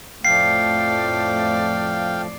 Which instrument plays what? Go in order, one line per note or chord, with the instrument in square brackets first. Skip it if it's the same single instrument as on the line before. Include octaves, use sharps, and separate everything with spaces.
[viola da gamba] F2 A2 D5 [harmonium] F3 A3 [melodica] F5 G5 [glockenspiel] C7